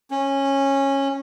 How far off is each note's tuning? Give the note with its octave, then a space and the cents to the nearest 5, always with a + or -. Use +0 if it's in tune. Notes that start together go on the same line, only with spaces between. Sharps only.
C#4 -15